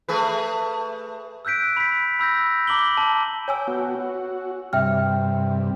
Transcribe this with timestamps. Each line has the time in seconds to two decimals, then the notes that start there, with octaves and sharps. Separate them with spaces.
0.09 A3 G#4 B4
1.45 E6 F#6 G6 B6 D7
1.77 B5 B6
2.19 B5 E6 G6 A#6
2.67 A#5 D6 F#7 G7
2.97 A5
3.48 C#5 G5 G#5 E6
3.67 B3 F#4
4.00 F#4
4.73 G2 C3 E5 G5 F6